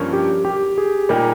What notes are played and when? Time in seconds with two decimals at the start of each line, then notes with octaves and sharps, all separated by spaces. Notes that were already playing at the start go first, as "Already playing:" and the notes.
Already playing: G2 F3 A#3 C#4
0.13 G4
0.45 G4
0.78 G#4
1.09 A#2 G3 A#3 D#4 G4 A#4